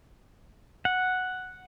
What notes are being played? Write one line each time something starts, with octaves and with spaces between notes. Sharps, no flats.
F#5